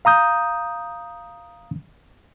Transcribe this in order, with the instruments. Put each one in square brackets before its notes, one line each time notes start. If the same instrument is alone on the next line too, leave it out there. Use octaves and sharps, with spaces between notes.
[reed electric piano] F5 A#5 D#6 G6